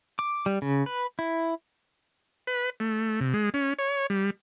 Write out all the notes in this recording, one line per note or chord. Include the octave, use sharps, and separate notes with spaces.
D6
G3
C#3
B4
E4
B4
A3
C3
G#3
C#4
C#5
G3